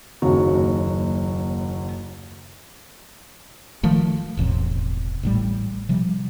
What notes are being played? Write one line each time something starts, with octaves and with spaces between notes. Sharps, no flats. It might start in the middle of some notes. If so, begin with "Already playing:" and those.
F#1 D#2 F#3 F#4
D#3 F3 A3
E1 A1 E2 C3
A1 A2 G3
C3 F3 G3